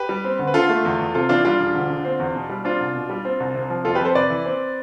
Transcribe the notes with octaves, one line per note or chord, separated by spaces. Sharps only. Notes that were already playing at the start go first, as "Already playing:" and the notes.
Already playing: G4 B4
G3
C4
D2
B4
D3 F4 A4
A3
E2
E2
C3 F4 A4
E3 D4 F4
G3 D4 F4
E1
D2
D3
C4
E2
B2
G3
C4 D4 F4
C2
B2
G3
C4
C2
C3
F3
F2 F4 A4
G4 B4
F2 A4 C5
C3 B4 D5
E3
C4